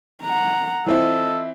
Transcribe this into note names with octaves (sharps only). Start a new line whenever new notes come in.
F#5 A#5
E3 C4 E4 F4 A4 D#5